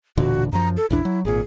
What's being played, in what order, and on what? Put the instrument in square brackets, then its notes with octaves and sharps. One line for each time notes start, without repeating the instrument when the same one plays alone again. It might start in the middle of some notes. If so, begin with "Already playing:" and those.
[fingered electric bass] E1 A#2 D3 [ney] F#4
[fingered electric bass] F#2 F3 [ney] A#5
[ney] A4
[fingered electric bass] A#1 E2 D4 [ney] E4
[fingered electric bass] F#3
[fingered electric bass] G#1 A#2 [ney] G#4